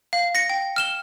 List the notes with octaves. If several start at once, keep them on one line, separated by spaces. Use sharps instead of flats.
F5
A#6 C#7
G5
F6 E7 G7